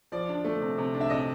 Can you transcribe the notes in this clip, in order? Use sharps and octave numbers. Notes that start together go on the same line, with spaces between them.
F3 D5
D4
A3
C3
C3
D4
E5
C3 D#5